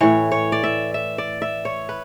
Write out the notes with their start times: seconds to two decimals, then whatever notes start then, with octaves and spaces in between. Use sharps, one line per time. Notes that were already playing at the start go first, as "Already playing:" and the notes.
0.01 A2 E3 C#5
0.32 C#5
0.52 D5
0.64 E5
0.94 E5
1.18 D5
1.42 E5
1.65 C#5
1.89 B4